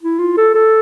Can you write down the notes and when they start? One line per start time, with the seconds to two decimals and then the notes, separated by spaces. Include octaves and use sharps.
0.02 E4
0.19 F4
0.37 A4
0.54 A4